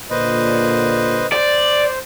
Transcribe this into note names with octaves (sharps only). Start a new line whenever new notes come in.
A#2 D3 B4 C5 D#5
C5 D5